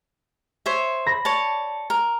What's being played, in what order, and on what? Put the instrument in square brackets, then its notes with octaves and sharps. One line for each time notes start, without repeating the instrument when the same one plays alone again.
[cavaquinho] C5 C#5 E5
[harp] B5 A#6
[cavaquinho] C#5 D5 A5
A#4